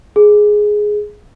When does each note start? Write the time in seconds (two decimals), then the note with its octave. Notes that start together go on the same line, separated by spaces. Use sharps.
0.16 G#4